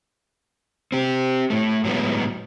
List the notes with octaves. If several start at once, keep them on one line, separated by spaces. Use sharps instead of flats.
C4 G4
A2 A3
A2 F#3 G#3 B3